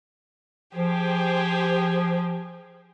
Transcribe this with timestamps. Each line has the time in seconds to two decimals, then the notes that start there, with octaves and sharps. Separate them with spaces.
0.75 F3 G4 G#4 C5